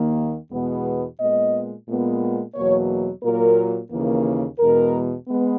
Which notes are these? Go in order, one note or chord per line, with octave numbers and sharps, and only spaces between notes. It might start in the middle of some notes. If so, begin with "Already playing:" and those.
Already playing: D#2 D#3 A#3
E2 B2 G#3 B3
A#2 G#3 B3 D#5
A#2 G#3 B3
E2 B2 F#3 A#3 C#5
A#2 F#3 A#3 A#4
D#2 C#3 E3 A#3
E2 B2 G#3 A#4
G#3 B3